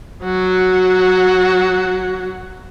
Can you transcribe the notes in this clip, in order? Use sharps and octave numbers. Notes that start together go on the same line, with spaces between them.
F#3 F#4